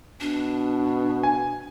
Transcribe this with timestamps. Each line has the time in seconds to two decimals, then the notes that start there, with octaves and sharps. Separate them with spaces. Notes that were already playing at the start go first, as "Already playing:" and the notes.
0.20 B2 D4
1.23 G#5